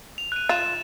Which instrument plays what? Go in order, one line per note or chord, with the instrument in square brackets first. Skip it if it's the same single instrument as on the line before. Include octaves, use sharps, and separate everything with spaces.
[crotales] F7
F#6 D#7
[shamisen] F4 [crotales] A6 E7